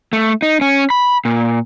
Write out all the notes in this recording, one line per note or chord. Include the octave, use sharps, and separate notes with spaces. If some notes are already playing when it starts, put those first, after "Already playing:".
A3
D#4
C#4
B5
A#2